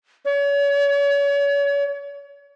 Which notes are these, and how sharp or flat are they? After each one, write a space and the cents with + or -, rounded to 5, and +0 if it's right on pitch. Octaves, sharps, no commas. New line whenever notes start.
C#5 +35